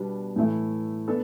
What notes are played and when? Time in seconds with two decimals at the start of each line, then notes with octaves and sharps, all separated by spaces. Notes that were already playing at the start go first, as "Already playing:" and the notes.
Already playing: B2 G3 B3 D4
0.36 A2 E3 A3 E4
1.08 B3 D4 A4